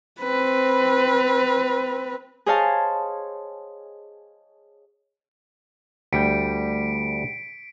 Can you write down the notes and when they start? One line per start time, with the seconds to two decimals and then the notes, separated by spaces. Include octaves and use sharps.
0.20 C4 B4
2.46 G#4 C5 C#5 D#5 F5 A5
6.13 D2 G3 G5 B6 C#7 D7